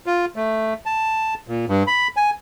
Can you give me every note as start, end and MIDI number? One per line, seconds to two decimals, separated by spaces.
0.06 0.25 65
0.36 0.74 57
0.86 1.34 81
1.48 1.65 46
1.69 1.83 43
1.87 2.08 83
2.17 2.30 80